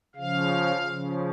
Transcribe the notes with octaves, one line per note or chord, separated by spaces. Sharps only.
C#3 F3 F5
C#3 F3